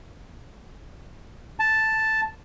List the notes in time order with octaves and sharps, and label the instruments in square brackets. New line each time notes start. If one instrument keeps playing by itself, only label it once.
[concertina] A5